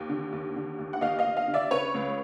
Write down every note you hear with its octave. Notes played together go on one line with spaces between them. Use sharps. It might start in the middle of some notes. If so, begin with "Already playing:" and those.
Already playing: D#2
D3
D#2
D3
D#2
F#5
D#2 D#5 F5
D#5 F5
D#2
D#5 F5
D3
D5 E5
C#3 B4 C#5
C#2